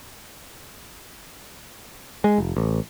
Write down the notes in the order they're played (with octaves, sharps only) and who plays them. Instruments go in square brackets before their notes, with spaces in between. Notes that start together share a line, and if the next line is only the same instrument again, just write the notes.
[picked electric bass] G#3
F1
A1